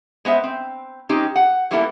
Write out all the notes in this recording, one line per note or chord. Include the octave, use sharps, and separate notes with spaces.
G#3 B3 C5 E5
C4
G#3 C4 C#4 D#4 G4
F#5
F#3 G3 A#3 B3 E4 A4